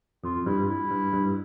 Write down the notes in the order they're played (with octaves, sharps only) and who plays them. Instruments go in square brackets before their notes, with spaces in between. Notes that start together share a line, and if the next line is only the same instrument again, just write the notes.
[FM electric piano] F2 [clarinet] F4
[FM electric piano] G2 [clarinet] E4
[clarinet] E4
[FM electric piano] G2
G2